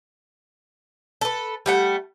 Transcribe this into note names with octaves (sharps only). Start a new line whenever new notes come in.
A4 B4
G3 A3 F#5